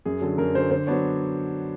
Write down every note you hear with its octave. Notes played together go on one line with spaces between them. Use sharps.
F#2 G#4
D3 F#3 A4
F#2 A#4
D3 F#3 C5
D3 C5
F#3 B3 D4 C#5